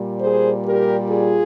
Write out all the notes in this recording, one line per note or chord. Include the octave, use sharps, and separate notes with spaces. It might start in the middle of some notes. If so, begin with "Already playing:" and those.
Already playing: A#2 G3
G#4 C5
G4 A#4
F4 G#4